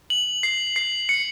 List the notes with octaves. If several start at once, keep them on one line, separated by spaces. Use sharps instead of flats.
F#7
C7
C7
C#7